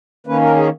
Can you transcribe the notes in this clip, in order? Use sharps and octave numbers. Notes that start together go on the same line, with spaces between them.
D#3 A#3 C#4 B4
A#4
G#4